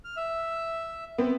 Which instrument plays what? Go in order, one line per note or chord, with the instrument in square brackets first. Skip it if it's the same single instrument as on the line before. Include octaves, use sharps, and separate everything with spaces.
[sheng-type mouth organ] F6
E5
[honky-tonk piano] B3 C4